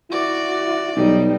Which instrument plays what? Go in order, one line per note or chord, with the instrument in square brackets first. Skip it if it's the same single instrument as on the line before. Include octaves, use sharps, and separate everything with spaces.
[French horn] E4 [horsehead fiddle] F#4 [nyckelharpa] D5
[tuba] B1 [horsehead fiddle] G3 D#4